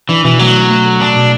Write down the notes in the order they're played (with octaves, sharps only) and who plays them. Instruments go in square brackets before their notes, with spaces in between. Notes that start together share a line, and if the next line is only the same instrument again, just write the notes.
[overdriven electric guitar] E3 [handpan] D4
[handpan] B2 [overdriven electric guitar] E3
[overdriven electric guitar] F#3 [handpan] A3
[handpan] D4
A3
A4
[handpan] A3 [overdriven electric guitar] D4
[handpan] B2